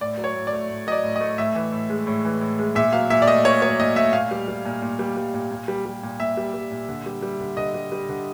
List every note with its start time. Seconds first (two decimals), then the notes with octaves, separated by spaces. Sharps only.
0.01 A2 D5
0.18 F#3
0.24 C#5
0.35 A2
0.47 D5
0.53 A3
0.70 A2
0.87 F#3 D#5
0.92 D5
1.04 A2
1.16 A3 D#5
1.38 A2 E5
1.55 E3
1.72 A2
1.90 G#3
2.07 A2
2.25 E3
2.41 A2
2.59 G#3
2.75 A#2 E5
2.93 F#3 F5
3.10 A#2 E5
3.22 D5
3.27 A3 D#5
3.45 A#2 C#5
3.62 F#3 C#5
3.79 A#2 D#5
3.96 A3 E5
4.13 A#2 F5
4.31 G3
4.48 G3
4.65 A#2
4.82 A#2
4.99 G3
5.17 G3
5.34 A#2
5.51 A#2
5.68 G3
5.86 G3
6.03 A#2
6.20 A#2 E5
6.37 G3
6.54 G3
6.71 A#2
6.89 D3
7.06 G3
7.22 G3
7.40 D3
7.57 D3 D#5
7.74 G3
7.92 G3
8.09 D3